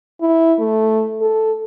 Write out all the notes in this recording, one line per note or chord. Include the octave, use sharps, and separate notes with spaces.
E4
A3
A4